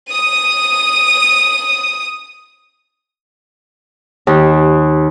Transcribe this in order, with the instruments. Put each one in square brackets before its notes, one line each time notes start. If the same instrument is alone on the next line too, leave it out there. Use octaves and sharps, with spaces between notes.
[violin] D#6 D#7
[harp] D#2